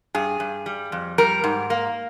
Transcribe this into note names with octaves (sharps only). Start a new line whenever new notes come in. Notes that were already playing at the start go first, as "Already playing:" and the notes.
G2 G#4
G2
G3
F2
G3 A#4
G#2
A#3